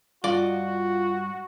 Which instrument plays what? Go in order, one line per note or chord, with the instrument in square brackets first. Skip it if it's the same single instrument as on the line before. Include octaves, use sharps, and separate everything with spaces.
[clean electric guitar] G2 D#5 [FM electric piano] F4 [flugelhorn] F#4 [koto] D5